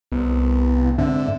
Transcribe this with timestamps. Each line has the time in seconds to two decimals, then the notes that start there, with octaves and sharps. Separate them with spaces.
0.12 C2 B3
0.98 G#2 D3 C4 E5